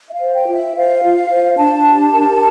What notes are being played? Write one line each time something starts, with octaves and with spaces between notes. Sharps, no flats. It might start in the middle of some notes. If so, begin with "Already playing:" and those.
E5
F5
C5
G5
F4
E5
C5 F5
F4
C5
D4 A5
G4
A#4